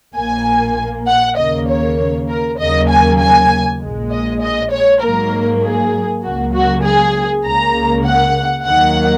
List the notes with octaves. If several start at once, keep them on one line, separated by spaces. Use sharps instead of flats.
A#1 A#2 A#3 G#5
F#5
D#2 C#3 A#3 D#5
C#5
A#4
D#2 C#3 F#3 A#3 D#5
G#5
G#5
A#1 A#2 G#3
D#5
D#5
C#5
G#2 F#3 A#3 A#4
G#4
C#2 C#3 F#3 A#3 F#4
F#4
G#4
C#2 C#3 A#3 A#5
F#5
D#2 D#3 F#3 A#3 F#5